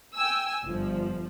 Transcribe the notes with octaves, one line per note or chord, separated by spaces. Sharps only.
G5 G#5 E6
G1 F3